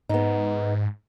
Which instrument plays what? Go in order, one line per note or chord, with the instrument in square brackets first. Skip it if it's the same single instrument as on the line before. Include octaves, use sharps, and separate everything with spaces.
[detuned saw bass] G#2 [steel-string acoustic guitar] B3 D#4